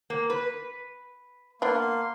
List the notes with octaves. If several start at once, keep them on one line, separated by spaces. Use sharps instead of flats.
A#3
B4
A#3 B3 D4 C6